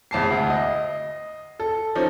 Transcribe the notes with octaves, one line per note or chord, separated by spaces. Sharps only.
F1 E2 A5 C7
D2
D#5
A4
F3 C#4 D#4